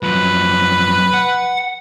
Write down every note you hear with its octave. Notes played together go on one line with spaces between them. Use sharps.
F#2 F3 B4
F#5